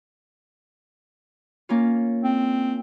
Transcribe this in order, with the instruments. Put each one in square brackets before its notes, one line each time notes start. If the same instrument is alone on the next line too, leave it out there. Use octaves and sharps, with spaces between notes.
[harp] A#3 C#4 F4
[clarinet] C4